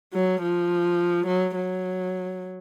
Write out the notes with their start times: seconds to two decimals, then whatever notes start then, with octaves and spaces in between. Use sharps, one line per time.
0.13 F#3
0.42 F3
1.27 F#3
1.55 F#3